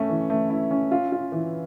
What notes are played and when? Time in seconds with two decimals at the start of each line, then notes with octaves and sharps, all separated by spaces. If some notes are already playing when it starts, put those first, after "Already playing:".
Already playing: A3 C#4
0.09 E3
0.30 A3
0.50 E4
0.71 C#4
0.91 F4
1.12 F4
1.32 E3